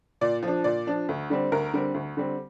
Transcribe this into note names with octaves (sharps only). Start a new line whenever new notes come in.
A#2 D5
F3 D4
A#2 D5
F3 D4
D2
D3 G3 C4
D2 A#4
D3 G3 C4
D2
D3 G3 C4